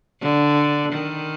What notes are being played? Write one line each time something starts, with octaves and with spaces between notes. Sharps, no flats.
D3
D#3